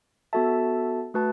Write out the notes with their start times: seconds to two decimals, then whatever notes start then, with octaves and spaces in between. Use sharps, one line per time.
0.33 B3 F#4 A4 E5 A5
1.14 A3 F#4 B4 A5